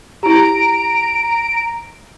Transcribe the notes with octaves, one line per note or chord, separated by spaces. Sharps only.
E4 G4 A#5 D7